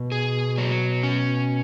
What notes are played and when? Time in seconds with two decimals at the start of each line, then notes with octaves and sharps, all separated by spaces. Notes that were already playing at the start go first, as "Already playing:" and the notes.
Already playing: B2
0.12 G#4
0.57 F#3
1.03 C#4